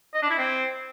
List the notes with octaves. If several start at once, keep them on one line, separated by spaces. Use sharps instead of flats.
D#5
D4
E4
C4